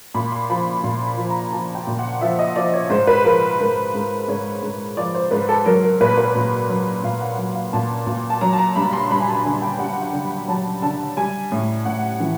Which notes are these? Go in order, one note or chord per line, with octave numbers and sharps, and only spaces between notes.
A#2 B5
C6
F3 B5
A#2 C6
B5
F3
A#5
F3 A5
G5
A#2
F#5
F3 E5
D#5
F3 D5
C#5
G#2 C5
B4
F3 A#4
G#2 A#4
G#2
G#2 C#5
G#2
F3 D5
C5
G#2 B4
A4
F#3 A#4
A#4
A#2 B4
B4
A#2
F#3
A#2 F5
F#5
F#3 F#5
F5
A#2 A5
A#2
A5
F#3 A#5
A5
A#5
G2 B5
C6
G2 B5
G#5
A5
D3 G#5
G5
G2 F#5
G5
D3
B5
F#3 A5
D3 A5
G3 G#5
A2
A2 F#5
E3